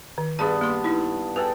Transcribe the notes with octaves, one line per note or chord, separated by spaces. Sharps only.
D#3
G2 B3 D4 G#4 A5
A#3 C6
D#4 E4
G#4 A4 B4 G5